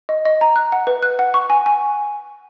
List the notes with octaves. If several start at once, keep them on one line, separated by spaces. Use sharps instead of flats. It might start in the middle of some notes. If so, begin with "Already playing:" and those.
D#5
D#5
A#5
F#6
F#5
B4
F#6
F#5
C#6
G#5
G#5